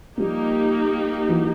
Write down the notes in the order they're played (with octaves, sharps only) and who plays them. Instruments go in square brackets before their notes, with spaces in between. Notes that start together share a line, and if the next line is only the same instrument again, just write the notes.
[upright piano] F3 G3 [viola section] A#3 D#4 G4
[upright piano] E3 F#3